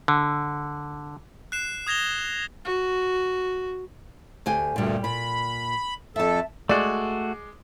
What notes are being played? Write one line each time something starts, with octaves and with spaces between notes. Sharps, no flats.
D3
F#6 C7 E7
D#6 G#6 A#6 F7 G7
F#4
D2 G4 G#5
D2 G2 A#2 G3
A#2 B5
F2 A4 E5 A5
G#3 A3 F#4 D5